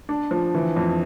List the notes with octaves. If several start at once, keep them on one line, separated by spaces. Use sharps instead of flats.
D4
F3
E3
F2